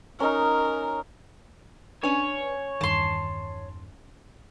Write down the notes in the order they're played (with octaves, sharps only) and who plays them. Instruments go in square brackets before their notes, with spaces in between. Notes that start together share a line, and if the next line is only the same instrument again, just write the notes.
[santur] C#4 D#4 [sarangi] A#4
[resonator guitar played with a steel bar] C#4 G#5 [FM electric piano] D4 B4 [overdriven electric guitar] C#5
[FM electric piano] E2 G2 D#3 [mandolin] A5 C6